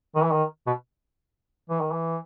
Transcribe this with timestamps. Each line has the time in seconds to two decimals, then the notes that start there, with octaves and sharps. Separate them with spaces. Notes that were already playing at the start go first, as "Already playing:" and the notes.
0.16 D#3
0.24 E3
0.33 D#3
0.67 B2
1.70 E3
1.81 D#3
1.92 E3